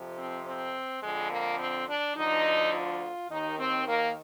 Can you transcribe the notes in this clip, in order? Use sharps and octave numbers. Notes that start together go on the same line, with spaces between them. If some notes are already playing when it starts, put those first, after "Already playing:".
Already playing: F2 C3 F3
C4
C4
F2 D3 F3 G#3
A#3
C4
D4
D2 D3 F3 D#4
F4
D#2 D#3 D#4
C4
A#3